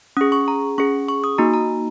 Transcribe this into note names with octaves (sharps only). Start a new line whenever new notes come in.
C#4 G#4 D#6
C#6
A#5
C#4 G#4 C#6
C#6
D#6
A#3 D#4 F#4 A#5
A#5